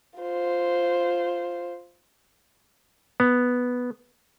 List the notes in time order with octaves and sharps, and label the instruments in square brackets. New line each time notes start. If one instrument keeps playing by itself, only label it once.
[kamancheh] F4 C5
[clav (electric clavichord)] B3